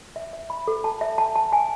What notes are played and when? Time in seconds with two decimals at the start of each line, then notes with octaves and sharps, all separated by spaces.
0.16 E5
0.33 E5
0.50 B5
0.68 A4
0.84 A5
1.01 E5
1.18 A5
1.36 A5
1.52 G#5